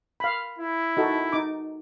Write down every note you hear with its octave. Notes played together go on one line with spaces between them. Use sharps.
F5 B5
E4
D#4 F#4 A4
D#4 D6